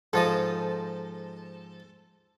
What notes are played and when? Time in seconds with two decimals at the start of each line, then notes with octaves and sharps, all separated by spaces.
0.13 G#2 F3 A4 D#5